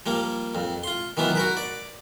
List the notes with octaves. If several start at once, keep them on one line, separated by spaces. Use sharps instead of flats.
F3 G3 A#3
F2
F4 C6
D#3 E3 F#3 B3 F4
F#4 A#4 B4
D5